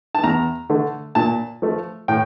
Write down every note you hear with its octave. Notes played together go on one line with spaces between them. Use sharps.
A5
E2 A#5
D3 A3
A#2 A5
F3 A3
A2 G5